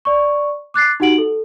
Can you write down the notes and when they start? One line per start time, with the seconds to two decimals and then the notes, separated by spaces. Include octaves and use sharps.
0.05 D5 C#6
0.74 D6 F#6 A6 C7
1.00 D#4 F#4 G4 F#5 D7 F#7
1.18 A4